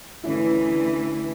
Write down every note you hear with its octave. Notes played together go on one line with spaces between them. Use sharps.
D2 D3 E3 C#4 E4